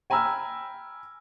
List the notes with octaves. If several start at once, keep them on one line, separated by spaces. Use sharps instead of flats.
G5 G#5 A#5 B5 E6 F6